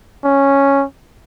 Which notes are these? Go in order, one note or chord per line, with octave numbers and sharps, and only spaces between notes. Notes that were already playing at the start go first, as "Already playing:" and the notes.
C#4